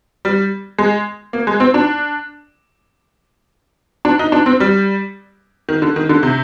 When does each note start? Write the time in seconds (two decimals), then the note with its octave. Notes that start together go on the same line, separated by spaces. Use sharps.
0.25 G3
0.78 G#3
1.33 A#3
1.47 G#3
1.60 C4
1.74 D4
4.05 D4
4.19 D#4
4.32 D4
4.46 C4
4.60 G3
5.69 D#3
5.82 D3
5.96 D#3
6.09 D3
6.23 C3